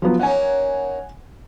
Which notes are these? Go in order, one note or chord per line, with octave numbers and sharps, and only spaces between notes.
F3 F#3 B3
A#3 C#4 D#4 F#5 G#5